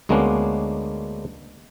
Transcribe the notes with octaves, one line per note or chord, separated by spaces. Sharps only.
D2 G#3 A#3 B3 C#4 D4